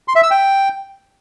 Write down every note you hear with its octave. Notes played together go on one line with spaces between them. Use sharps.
C6
E5
E6
G5